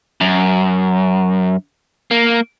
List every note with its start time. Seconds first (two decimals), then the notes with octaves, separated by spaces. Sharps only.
0.21 F#2
2.11 A#3